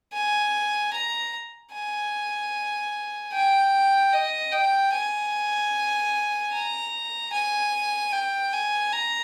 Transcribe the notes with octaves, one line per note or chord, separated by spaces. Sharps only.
G#5
A#5
G#5
G5
D#5
G5
G#5
A#5
G#5
G5
G#5
A#5